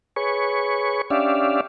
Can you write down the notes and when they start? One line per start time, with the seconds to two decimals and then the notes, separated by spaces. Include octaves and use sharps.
0.16 G#4 B4 C#5 C#6
1.10 C#4 D4 G4 D5 E5 F5